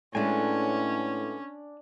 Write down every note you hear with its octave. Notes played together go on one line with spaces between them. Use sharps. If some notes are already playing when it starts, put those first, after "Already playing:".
A2 G#3 A3 B3 C#4 D4 G#5